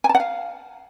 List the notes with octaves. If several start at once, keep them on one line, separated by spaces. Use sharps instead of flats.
G#5
A5
F#5
F5